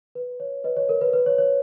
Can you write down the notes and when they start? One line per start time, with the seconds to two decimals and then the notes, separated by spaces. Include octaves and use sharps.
0.15 B4
0.40 C#5
0.64 B4 D#5
0.77 C#5
0.89 A#4
1.01 B4
1.13 B4
1.26 C#5
1.38 C#5